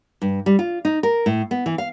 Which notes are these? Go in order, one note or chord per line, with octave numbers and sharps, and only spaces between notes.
G2
G3
F4
D#4
A#4
A2
B3
E3
F5